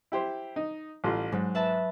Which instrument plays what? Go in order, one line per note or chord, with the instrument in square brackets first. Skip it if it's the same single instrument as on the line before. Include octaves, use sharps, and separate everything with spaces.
[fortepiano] E4 G4 C5
D#4
A1 G3 F4
[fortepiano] G#2 [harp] F#3
[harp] B4 E5 A5